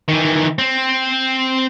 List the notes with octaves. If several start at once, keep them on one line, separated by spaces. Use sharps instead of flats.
D#3 E3
C4